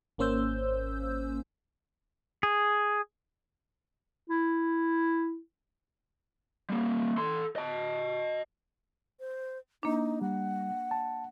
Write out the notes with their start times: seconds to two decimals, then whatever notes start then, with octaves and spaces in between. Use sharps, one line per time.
0.18 G#1 A#3 C#4 C5 E6 G6
2.43 G#4
4.30 E4
6.70 G3 A#3
7.18 A4 C6
7.56 D#5 A5
9.20 C5
9.83 A#3 D4 D#4
10.21 G3 F#5
10.91 A5